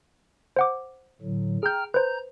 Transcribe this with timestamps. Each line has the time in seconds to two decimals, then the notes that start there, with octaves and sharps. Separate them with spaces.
0.56 C5 F#5 D6
1.21 A2 D3 F#3
1.63 G#4 G5 A#5 F6 G6
1.94 B4 C5 A#5 G6